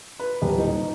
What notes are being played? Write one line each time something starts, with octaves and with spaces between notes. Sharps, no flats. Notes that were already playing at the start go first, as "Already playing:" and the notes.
B4
D#1
D#4